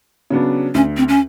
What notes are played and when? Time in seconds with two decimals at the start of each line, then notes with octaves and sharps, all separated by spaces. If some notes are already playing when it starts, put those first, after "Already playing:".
0.30 C#3 F#3 B3 D4
0.74 D2 C#4
0.97 C4
1.09 C#4